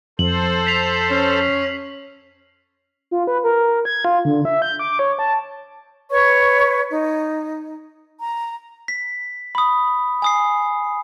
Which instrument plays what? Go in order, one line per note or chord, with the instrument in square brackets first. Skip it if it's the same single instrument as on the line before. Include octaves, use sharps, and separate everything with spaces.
[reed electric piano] F2 [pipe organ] A4 C5 [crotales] F#7
[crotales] B6 C7 F7
[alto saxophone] C#4
[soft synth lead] F4
B4
A#4
G#6
F4
D3
E5
G6
D6
C#5
A5
[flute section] B4 C#5 C#6
D#4
A#5
[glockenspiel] B6
B5 D#6
G#5 D#6 C7